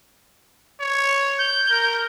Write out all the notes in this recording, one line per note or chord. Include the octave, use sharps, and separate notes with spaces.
C#5
G6
A#4